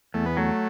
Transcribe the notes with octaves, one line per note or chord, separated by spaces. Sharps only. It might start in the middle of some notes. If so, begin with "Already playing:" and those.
E2 A3
B3
F#3 A3